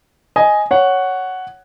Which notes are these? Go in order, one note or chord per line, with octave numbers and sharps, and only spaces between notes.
D#5 G#5
C#5 F#5